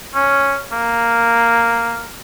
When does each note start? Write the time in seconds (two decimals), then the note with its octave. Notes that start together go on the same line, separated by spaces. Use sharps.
0.15 C#4
0.72 A#3